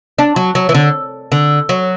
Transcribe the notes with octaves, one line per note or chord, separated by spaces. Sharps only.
D4
F#3
F#3
E3
D3
D3
F#3